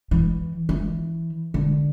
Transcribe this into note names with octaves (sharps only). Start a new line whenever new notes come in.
E3
E3
D3